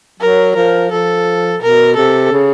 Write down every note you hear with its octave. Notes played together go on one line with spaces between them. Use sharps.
F#3 A#4
F3 A#4
F3 A4
B2 A#4
C3 A4
C#3